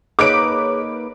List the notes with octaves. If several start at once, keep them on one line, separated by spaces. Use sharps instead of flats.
A#3 D#4 G#4 B4 C#5 D6 D7